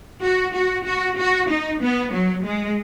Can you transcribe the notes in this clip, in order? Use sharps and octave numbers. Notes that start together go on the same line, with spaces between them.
F#4
F#4
F#4
F#4
D#4
B3
F#3
G#3